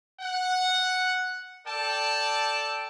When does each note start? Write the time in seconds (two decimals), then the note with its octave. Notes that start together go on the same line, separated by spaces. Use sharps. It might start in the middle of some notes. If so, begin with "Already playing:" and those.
0.20 F#5
1.65 A4 D5 G5 A5